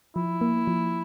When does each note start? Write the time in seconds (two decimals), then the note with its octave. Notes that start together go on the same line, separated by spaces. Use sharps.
0.16 F3 E4
0.41 A#3
0.67 F3